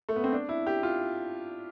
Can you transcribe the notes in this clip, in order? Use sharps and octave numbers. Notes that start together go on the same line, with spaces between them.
A3
B3
C4
D4
E4
G4
F4